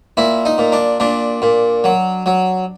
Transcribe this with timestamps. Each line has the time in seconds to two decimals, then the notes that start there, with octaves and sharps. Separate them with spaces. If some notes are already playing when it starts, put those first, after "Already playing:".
0.17 A#2 E4
0.45 D#4
0.58 A#2
0.72 D4
1.00 A#2 D4
1.42 A#2
1.84 F#3
2.26 F#3